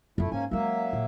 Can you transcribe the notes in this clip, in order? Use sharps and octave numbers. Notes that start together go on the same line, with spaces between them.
F#2 A3 E4 F4
G#2 A#3 C#4 G#5
F#3 G#3 A#3 C#4 E5
A#2